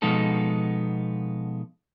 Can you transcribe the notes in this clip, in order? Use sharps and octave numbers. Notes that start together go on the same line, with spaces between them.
B2 F3 G#3 B3 D#4 A4